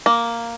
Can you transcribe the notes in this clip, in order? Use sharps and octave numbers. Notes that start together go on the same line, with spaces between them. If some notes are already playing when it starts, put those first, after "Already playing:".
A#3